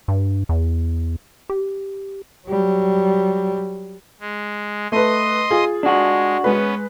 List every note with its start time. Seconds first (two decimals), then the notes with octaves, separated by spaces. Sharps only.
0.08 G2
0.49 E2
1.50 G4
2.47 F#3 G3
4.20 G#3
4.92 A3 B4 D#5 C6 D#6
5.50 F4 G#4
5.83 G#3 D4 F#4
6.44 G#3 B3 C#4 B4